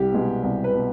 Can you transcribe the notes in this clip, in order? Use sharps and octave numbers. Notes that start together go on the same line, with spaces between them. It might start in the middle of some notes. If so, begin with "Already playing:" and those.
Already playing: C2 G4
B2 G#3
C2
B4
B2